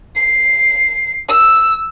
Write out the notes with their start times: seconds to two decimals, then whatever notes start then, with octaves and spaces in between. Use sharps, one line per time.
0.15 C7
1.29 E6